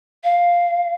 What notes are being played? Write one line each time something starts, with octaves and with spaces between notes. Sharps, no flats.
F5